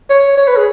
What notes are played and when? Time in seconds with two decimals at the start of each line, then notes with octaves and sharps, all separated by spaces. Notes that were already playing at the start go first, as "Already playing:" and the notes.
0.10 C#5
0.37 C#5
0.47 B4
0.57 G#4